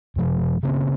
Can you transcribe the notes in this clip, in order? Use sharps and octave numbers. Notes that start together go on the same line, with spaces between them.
F#2 C3 F3
C#3 A#3 C4 C#4